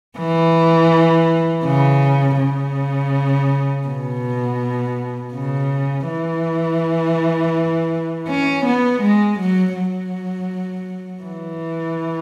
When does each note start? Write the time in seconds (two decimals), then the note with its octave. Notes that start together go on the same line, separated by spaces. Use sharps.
0.18 E3
1.65 C#3
2.39 C#3
3.87 B2
5.34 C#3
6.08 E3
8.29 C#4
8.66 B3
9.02 G#3
9.40 F#3
9.76 F#3
11.24 E3